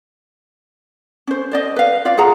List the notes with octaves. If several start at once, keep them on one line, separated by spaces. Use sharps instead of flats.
C#4 C5
C5 D5 D#5
B4 F5
F4 D5 F5
F4 G#4 F#5 A#5